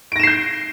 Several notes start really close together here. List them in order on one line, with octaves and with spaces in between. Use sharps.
D7 A#6 E7 C7 G6